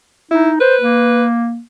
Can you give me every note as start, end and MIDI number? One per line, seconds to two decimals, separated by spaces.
0.31 0.60 63
0.31 0.51 64
0.60 1.25 71
0.60 0.76 72
0.81 1.61 58